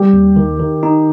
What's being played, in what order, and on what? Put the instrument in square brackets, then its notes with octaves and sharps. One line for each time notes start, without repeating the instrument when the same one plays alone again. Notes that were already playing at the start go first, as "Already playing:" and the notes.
Already playing: [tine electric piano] G3 [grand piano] G4
[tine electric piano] D#2
D#3
D#3
D#4